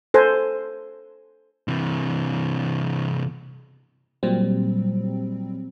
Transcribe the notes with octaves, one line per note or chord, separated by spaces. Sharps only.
A4 C5 G#5
C3 E3
A#2 F#3 G3 C4